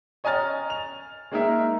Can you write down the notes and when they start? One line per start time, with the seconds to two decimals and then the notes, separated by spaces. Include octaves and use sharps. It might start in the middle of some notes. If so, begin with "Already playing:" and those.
0.24 C#5 D#5 G#5 A#5 F6 A6
0.70 F7
1.32 G#3 A#3 D#4 A#4 E5